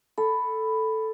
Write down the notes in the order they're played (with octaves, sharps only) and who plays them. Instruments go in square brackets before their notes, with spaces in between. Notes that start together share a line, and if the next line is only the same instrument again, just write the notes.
[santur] A4 [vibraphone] B5